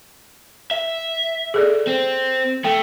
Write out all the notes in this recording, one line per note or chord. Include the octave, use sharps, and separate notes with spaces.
E5
G#4 A4 D5
C4
A3 G5